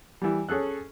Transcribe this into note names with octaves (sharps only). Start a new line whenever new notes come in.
E3 G3
C#4 G#4 A4 F#6